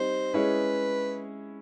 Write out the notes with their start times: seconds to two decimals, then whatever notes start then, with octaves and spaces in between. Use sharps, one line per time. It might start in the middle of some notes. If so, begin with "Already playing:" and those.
Already playing: G3 C4 D#4 C5
0.34 G#3 C#4 E4 G#4 B4 C#5